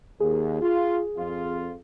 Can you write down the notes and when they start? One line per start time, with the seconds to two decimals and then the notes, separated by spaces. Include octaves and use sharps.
0.20 D#2 G#4
0.62 F4
1.18 F2 F4